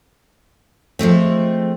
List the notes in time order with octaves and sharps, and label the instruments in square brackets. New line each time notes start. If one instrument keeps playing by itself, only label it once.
[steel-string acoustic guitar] F3 G#3 A3 C4